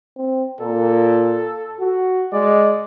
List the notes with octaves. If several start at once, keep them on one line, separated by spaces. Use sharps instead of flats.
C4
A#2 A4
F#4
G#3 D5